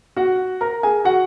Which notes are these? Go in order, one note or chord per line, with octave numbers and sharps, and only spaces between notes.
F#4 F#5
A#4 A#5
G#4 G#5
F#4 F#5